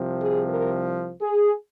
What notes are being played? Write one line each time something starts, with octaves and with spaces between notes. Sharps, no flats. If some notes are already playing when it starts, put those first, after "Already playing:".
Already playing: C2 C3 F3
G#4
A#4
G#4